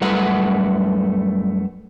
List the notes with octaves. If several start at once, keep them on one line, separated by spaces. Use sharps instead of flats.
F#2 G3 A3 A4 B4 F#5